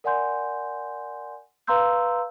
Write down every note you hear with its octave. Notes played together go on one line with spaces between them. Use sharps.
A#4 D5 F#5 G#5 C6 G6
B4 F5 A#5 C6 E6 G6